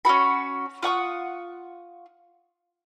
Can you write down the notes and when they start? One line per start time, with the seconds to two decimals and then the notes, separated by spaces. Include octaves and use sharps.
0.05 C#4 F4 F#4 B5
0.83 F4 F#5 C#6 D#6